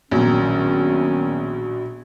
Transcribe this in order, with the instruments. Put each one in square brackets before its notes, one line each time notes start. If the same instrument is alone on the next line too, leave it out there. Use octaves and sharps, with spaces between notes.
[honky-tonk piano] A#1 B2 [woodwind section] D#3 F#3 C#4